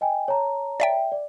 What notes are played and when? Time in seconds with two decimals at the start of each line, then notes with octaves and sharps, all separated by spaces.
0.01 D#5 G5 G#5
0.28 C#5 A5 A#5
0.80 D5 E5 G5
1.12 D5